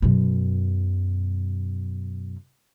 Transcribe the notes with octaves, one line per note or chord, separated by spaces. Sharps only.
F#2 B2